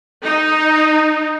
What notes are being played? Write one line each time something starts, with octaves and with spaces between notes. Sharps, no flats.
D#4